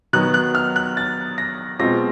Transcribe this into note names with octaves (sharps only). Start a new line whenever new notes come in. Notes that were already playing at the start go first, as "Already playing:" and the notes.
D#3 F#3 B3 F#6
F#6
F6
F#6
A6
A#6
B2 G#3 C4 F4 A#6